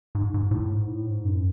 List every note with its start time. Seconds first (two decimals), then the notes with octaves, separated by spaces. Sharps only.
0.15 G#2
0.34 G#2
0.51 A2
0.70 G#2
0.87 A2
1.06 G#2
1.25 F#2